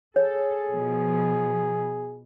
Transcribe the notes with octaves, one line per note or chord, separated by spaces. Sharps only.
G#4 A4 C#5
B2 F3